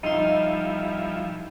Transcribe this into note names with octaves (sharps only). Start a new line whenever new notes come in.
F3 G3 D#4 E4 C6